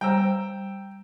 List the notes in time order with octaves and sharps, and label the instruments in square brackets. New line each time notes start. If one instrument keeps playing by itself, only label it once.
[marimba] G3 C5 [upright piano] G5 A#5 E6